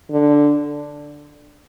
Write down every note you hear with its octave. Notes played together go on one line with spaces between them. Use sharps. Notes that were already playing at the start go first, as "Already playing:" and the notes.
D3